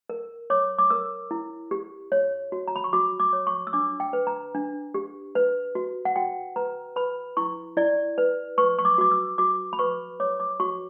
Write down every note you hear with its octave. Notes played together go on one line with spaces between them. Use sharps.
A#4
C#5 D6
D6
A#4 E6
E4
G4
C#5
F#4
A#5
B5
C#6
F#4 D6
D6
C#5
C#6
E6
D4 D6
G5
B4
A#5
D4
G4
B4
F#4
F#5
F#4 G5
B4 A#5
B4 B5
E4 C#6
E4 D5
B4
B4 C#6
C#6
D6
F#4 D6
E6
F#4 D6
B5
B4 C#6
C#5 D6
D6
F#4 C#6